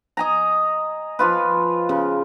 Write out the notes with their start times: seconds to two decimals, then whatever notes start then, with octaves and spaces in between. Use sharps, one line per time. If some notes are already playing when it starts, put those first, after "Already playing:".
0.17 D#5 G#5 A#5
1.19 F3 F4 B4
1.89 C#3